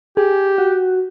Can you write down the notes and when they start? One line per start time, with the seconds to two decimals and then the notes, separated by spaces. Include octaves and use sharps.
0.17 G4 G#4
0.58 F#4